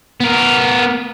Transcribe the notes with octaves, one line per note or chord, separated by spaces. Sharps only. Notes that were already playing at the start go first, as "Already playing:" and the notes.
B3 A#4